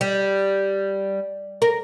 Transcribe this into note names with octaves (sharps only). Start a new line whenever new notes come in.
G3
A#4